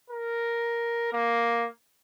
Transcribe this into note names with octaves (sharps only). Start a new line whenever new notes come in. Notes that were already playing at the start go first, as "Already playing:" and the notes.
A#4
A#3